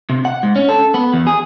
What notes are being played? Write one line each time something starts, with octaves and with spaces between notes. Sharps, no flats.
C3
F#5
G#2
C#4
A4
B3
E2
G#4